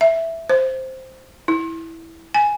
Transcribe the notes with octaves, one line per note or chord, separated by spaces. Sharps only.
E5
C5
E4
G#5